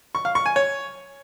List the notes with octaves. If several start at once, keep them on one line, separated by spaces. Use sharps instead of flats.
C#6
F5
C#6
G#5
C#5